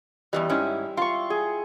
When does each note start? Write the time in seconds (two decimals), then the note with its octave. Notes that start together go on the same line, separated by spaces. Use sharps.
0.33 E2 G#2 E3 G3 D#5
0.49 G#2 C#4 E4
0.97 F4 C6 C#6
1.30 G#4